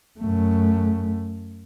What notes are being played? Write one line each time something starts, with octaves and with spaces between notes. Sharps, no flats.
F#2 A3